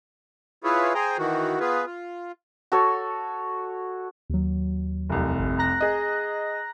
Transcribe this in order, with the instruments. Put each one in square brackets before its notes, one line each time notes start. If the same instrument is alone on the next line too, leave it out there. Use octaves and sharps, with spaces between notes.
[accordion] E4 F4 G#4 B4 C#5
G#4 C5 G5 G#5 A#5
D#3 E3 F#4
B3 F4 G#4 B4
F4
[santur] F#4 A4 C#5
[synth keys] D#2 F#3
[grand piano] F1 C2
[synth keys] G#1
A#5 F#6 A#6
[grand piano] G#4 D#5